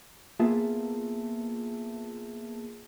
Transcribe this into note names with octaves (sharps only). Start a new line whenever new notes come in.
A#3 B3 F4 G#4 E5 A5